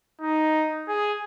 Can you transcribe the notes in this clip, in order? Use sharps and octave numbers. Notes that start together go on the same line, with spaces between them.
D#4
G#4